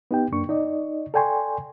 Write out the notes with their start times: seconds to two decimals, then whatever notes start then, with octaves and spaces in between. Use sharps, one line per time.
0.11 B3 D#4 G4 G5
0.32 F#2 A#3 D4 C#6
0.49 D#4 D5 D#5
1.14 A4 D5 G5 G#5 C6 C#6